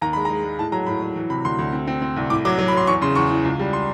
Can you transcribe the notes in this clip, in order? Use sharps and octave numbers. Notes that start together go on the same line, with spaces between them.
D#2 A#5
G#3 B5
G#3 A#5
G#3
A2 A5
F#3 A#5
A2 B5
F#3
E3
C3 B5
D2 C6
D2
C4
C4
C4
C2
A2 D6
F#3 D6
F#3
B5
F#3 C6
E2 C#6
C#3 C6
E2 C#6
E3
C#2
G3
C6